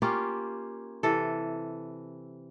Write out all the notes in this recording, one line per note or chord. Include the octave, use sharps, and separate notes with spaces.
A#3 C#4 F4 G4
C3 E3 A4